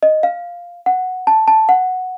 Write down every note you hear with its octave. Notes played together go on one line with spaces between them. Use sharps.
D#5
F5
F#5
A5
A5
F#5